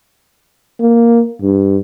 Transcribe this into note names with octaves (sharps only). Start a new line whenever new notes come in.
A#3
G2